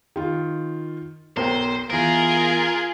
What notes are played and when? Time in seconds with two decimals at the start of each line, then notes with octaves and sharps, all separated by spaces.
0.16 D#3 F4
1.37 B1 A#4 C5 G5
1.90 E3 B3 F4 G#4 A#4